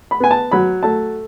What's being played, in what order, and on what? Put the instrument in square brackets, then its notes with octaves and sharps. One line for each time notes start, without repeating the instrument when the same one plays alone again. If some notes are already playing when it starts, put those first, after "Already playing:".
[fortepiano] B5
B3 G#5
A5
F#3 B5
A3 A5